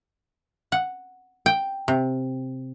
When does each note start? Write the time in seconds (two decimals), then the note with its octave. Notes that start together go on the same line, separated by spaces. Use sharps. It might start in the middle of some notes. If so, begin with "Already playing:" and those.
0.72 F#5
1.46 G5
1.88 C3